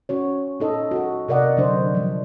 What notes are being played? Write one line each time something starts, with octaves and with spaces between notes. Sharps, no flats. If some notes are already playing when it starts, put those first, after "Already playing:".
C#4 F#4 C#5
A#2 D#4 A4 D#5
F#4 A4
C3 A#4 D5 D#5 F#5
D3 F#3 D4 C5
F3 G3